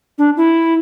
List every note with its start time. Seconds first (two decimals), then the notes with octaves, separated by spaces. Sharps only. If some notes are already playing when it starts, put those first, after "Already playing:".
0.18 D4
0.37 E4